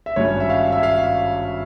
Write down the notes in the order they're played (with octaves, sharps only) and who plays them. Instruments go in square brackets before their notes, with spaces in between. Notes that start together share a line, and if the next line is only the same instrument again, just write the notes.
[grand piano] E5
G#1 G2 G3 C#4 C#5
E5
F5
E5
F5